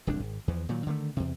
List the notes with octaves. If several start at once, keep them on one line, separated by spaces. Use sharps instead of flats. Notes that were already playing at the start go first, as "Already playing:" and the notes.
D1 C2 F2 D4
G#1
E2 E3 F3
A#2 D#3 F#3
D3 D#3 G#3 A3
E2 C3